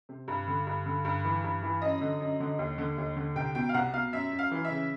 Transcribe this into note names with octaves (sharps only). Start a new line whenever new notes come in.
C3
G2
D3
G2
D3
G2
E3
G2
E3
F#2 D#5
D3
F#2
D3
D#2
D3
D#2
D3
C2 G5
B2 G5
F5
C2 F#5
B2 F5
F#2 E5
F#2
F5
E3
E5
C#3